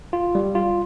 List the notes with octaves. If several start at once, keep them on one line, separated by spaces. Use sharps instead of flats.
F4
G3
F4